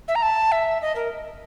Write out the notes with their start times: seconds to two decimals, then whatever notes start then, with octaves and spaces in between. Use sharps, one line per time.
0.08 E5
0.15 A#5
0.22 A5
0.52 E5
0.82 D#5
0.96 A#4